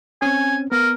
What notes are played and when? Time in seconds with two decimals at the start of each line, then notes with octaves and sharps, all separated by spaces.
0.22 C4 C#4 G#5
0.72 B3 A#4